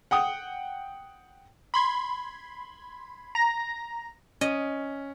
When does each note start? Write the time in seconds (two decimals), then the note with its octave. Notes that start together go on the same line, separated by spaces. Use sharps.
0.11 F#5 G5 D#6
1.74 B5 C6 G#6
3.35 A#5 A#6
4.41 C#4 D#5